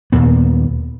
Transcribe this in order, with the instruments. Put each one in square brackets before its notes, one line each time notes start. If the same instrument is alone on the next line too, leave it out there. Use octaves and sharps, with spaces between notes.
[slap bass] D#2 A#2 B3